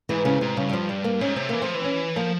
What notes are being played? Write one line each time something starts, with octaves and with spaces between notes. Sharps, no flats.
G#2 E3
G#2 C#3
G#2 C3
G2 C#3
G3
F3
G3
A#3
G#2 C#4
C3 C4
E3 A#3
F3 C4
E3
C#4
F3 A#3